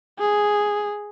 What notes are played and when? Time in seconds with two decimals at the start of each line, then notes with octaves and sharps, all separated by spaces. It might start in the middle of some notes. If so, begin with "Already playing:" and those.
0.19 G#4